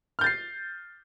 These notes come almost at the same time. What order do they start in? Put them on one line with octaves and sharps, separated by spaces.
F6 G6 A6 C7